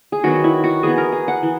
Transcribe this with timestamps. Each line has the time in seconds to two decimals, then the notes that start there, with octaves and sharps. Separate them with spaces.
0.12 G#4
0.23 D#3 F#3 B3 F#4
0.44 E4
0.64 F#4
0.83 E3 B3 G#4
0.98 A#4
1.12 G#4
1.28 F#5
1.43 E3